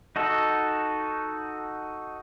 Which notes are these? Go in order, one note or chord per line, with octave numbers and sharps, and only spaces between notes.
D#4 F#4 A4